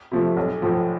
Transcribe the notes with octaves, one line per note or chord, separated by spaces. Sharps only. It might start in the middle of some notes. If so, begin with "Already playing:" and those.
C3 F3 A3
B1
A2 F3